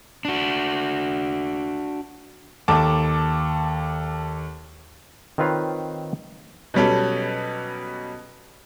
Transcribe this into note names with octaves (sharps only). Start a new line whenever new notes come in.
D4 F#4
D#2 A4 A5 D6
D#3 C4 F4 B4 C#5 F5
B2 F#3 G3 C#4 A4